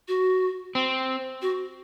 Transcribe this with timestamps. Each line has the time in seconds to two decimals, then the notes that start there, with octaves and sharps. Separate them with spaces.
0.08 F#4
0.75 C4
1.42 F#4